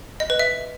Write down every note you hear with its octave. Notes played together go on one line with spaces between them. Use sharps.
D#5
B4
E5